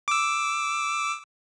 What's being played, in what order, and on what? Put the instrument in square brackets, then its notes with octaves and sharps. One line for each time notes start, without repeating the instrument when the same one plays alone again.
[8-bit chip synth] D6 E6